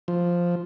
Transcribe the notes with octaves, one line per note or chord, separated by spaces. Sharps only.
F3